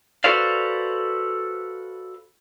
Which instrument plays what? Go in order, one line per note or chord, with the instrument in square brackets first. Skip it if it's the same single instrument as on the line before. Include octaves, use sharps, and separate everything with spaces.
[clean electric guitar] F#4 A4 B4 C5 D5 F5